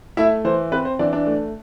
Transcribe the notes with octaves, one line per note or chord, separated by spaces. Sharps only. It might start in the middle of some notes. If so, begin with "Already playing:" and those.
A3 E4 E5
E3 C5
C4 B4
C5
E3 D4 D5
D4 D5
A3